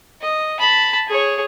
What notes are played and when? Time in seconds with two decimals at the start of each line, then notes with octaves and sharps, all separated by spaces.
0.21 D#5
0.59 A5 B5
1.08 G#4 C#5